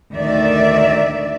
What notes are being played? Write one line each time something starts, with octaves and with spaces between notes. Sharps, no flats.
D2 D#3 D5 E5